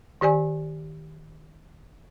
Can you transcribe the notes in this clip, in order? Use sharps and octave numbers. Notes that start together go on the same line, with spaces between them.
D#3 G4 D5 G#5